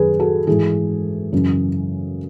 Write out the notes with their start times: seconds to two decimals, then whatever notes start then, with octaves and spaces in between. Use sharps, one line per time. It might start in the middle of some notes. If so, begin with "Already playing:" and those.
Already playing: F#2 D#3 G#4 B4
0.19 F#4 A4
0.47 G#2 E3 G#4
1.33 F#2 C#3 E3